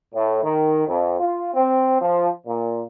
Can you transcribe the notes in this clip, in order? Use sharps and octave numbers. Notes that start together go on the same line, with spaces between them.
A2
D#3
F2
F4
C4
F3
A#2